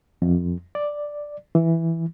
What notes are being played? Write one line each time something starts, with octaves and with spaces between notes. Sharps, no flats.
F2
D5
E3